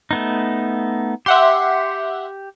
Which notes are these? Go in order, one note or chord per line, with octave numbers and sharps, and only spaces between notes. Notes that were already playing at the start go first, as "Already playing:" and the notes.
A3 B3 D#4
G4 E5 F#5 C6